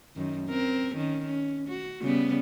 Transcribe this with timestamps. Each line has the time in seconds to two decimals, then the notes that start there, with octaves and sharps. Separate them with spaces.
0.16 F#2 D#3
0.47 C4 A#4
0.95 D#3 C#4
1.25 C#4
1.69 F#4
2.02 C#3 G3 B3